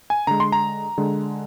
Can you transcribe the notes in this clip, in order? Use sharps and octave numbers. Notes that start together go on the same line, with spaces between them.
G#5
D3 G#3 A#5
C6
A#5
D3 G#3